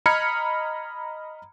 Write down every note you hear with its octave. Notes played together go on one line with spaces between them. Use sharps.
D#5 A#5 B5 F6 G#6 C#7